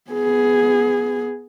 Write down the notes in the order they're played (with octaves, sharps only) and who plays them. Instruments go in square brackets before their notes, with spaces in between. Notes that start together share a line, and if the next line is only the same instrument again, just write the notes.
[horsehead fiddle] B3 G#4